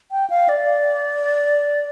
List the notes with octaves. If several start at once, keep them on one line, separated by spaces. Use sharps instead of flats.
G5
F5
D5